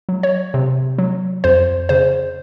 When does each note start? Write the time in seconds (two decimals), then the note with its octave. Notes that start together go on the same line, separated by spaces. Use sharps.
0.09 F#3
0.23 C#5
0.54 C3
0.98 F#3
1.44 F2 C5
1.89 C#3 C5